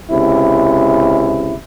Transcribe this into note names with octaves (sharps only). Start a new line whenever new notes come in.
C#2 C3 E4